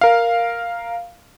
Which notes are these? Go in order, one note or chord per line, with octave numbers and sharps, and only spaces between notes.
A#4 F5